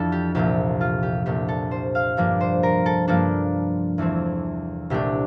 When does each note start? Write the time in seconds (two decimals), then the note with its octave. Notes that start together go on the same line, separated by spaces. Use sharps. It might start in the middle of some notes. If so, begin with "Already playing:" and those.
Already playing: F2 E3 D4 A4
0.12 G4
0.35 C2 A#2 F3 G4
0.81 F4
1.03 G4
1.26 C2 A#2 A3 D4 G4
1.48 A4
1.71 C5
1.95 F5
2.17 G2 F3 A#3 D4
2.41 C5
2.63 A#4
2.86 A4
3.08 G2 F3 A#3 D4 A4
3.98 E2 E3 A3 C4
4.90 C2 A#2 A3 D4 G4